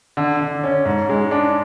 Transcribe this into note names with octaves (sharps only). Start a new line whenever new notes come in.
D3
D3
C#4
G#2
G#3
D4